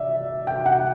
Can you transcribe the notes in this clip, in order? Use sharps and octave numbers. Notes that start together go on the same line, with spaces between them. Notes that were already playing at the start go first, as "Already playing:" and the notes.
Already playing: D5 E5
G5
F#5